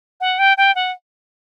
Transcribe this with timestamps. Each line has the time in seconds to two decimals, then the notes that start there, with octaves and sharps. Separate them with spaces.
0.21 F#5
0.39 G5
0.57 G5
0.75 F#5